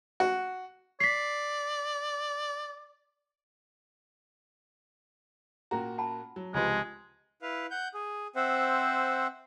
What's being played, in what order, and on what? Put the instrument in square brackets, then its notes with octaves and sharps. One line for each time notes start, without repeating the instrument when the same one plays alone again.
[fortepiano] F#4
[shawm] D5 [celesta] B6 C7
[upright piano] A#2 A#3 F#4 [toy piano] C#4 A#5
[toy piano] F#5 A5 B5
[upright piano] F#3
[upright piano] C#2 C3 F3 [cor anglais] G#3 [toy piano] F4 F#4 B4
[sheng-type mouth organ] E4 B4 F5
F#5 G6
G#4
C4 C5 E5 F#5